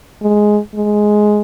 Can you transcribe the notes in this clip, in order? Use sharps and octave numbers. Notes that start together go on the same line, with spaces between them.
G#3
G#3